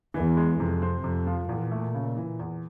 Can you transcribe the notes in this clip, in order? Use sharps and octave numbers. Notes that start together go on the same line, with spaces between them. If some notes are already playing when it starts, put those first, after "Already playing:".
E2 E3
G#3
F2 C3
C4
F2 C3
F3
E2 A#2
A3
C#3
E3
E2